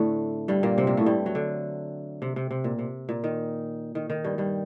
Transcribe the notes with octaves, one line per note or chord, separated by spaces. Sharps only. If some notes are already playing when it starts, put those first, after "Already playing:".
Already playing: A2 D3 A3 C4 D4
G2 G3
A#2 A#3
C3 C4
A#2 A#3
A2 A3
G2 G3
F#3
D3
C3
C3
C3
A#2
C3
A#2
D#3
D#3
D#3
G2 G3
G2 G3